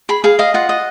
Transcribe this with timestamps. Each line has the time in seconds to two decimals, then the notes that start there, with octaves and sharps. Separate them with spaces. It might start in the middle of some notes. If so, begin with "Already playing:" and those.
0.09 G#4 B5
0.24 G#4 F5
0.39 D#5 F5
0.54 F4 F#5
0.69 D#5